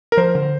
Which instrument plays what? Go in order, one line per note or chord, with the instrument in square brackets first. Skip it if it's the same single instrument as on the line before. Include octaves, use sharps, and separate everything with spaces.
[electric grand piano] A#4
[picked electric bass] F3 [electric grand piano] C5
[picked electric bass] D3